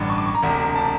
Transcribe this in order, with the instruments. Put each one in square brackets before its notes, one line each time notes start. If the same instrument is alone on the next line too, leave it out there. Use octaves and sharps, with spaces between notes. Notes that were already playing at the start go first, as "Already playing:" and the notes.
Already playing: [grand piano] A1 G2 D3
C#6
D6
C#6
A#5
E1 D2 C3
A5